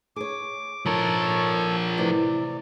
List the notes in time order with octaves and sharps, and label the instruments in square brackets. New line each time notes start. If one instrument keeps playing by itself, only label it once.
[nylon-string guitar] G#4 C#5 [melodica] D6
[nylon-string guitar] G#2 [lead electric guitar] F3 A#4 [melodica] A4 C#5
[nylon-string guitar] A2 C3 E3 [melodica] D5